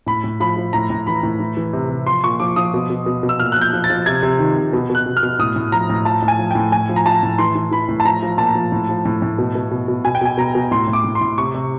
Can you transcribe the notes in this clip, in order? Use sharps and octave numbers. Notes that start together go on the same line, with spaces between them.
A2 B5
A2
F3 B5
F3
A2 A#5
A2
E3 B5
A2
E3
E3
C3
C3
F3 C6
A#2 C#6
F3 D6
F3 D#6
B2
B2
B2
B2
E6
A#2 F6
F3 F#6
G6
F3
A6
F3
C3 G#6
C3
D#3
C3
B2
B2
F#6
B2
F6
B2
A2 D#6
A2
F3 A#5
A2
F3 A5
A2
G#5
F3
A2 G5
A2 G#5
F3
A#5
F3 A5
A2
E3 C6
E3
E3 B5
A2
A5
F3 A#5
F3
A#2 A5
F3
A2
F3
A2
A2
B2
B2
B2
B2
B2 G#5
G5
B2 G#5
B2 A#5
B2
A2 C6
A2
D6
A2
C6
A2
C3 C#6
C3